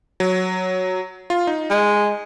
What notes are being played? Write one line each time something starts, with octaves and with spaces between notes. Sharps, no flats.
F#3
F4
D#4
G#3